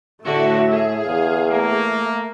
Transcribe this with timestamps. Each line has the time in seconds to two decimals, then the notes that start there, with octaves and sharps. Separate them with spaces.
0.24 A2 D3 A3 F#4 E5
0.70 G#4
1.06 E2 F5
1.51 A3 A#3